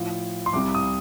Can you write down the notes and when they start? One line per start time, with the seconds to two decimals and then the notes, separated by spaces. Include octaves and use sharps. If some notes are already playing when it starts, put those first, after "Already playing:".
Already playing: A2 F3
0.46 C6
0.53 C2 C3 G3 D6
0.75 D#6